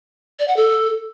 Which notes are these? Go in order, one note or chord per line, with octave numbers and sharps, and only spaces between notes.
D5
F#5
A4